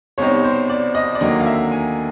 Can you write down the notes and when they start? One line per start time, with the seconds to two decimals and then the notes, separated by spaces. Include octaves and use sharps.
0.18 C2 B2 G3 C4 D#4 C#5
0.43 C5
0.69 D5
0.95 D#5
1.15 D5
1.21 D#2 D3 F#3 A#3 D#5
1.40 F5
1.46 E5
1.72 G#5